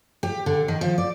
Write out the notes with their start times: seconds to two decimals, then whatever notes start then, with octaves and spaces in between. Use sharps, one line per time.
0.23 G4
0.46 D3
0.68 D#3
0.81 F3
0.98 D5